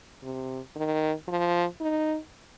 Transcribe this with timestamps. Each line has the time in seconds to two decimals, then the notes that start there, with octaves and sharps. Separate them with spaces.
0.23 C3
0.76 D#3
1.28 F3
1.80 D#4